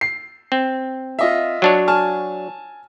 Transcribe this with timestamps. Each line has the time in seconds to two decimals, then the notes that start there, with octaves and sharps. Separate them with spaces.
0.01 C7
0.52 C4
1.19 F4 D#5 E5
1.62 F#3 D4 C#5
1.88 G#5 A5 F6